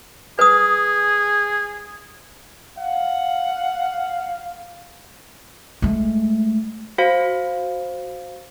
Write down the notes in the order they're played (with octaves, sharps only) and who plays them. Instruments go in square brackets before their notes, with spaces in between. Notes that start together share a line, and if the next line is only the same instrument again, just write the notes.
[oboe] G#4 [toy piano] B4 D#6
[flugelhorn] F5 [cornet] F#5
[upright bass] G#3 A3
[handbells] F#4 C5 F5